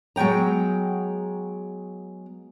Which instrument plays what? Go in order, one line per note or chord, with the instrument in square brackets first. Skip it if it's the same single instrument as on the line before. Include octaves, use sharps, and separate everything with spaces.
[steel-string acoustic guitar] F#3 G#3 B3 G5 A#5